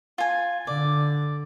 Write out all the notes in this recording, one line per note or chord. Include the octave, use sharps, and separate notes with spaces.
F4 G#5
D3 D5